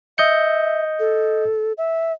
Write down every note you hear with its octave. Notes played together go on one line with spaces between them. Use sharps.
D#5 E5 G6 C#7
A4
E5